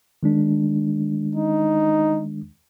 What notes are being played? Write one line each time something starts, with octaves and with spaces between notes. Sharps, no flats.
D#3 G#3 D4
D#4